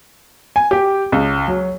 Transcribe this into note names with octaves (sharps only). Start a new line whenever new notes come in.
G#5
G4
C#2
F#3